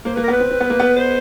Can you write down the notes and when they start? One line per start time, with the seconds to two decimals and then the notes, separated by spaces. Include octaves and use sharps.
0.05 A#3 C5
0.15 A#3 B4
0.23 A#4
0.28 B3 B4
0.40 C4
0.51 C4
0.61 B3
0.70 A#3
0.80 B3
0.96 C5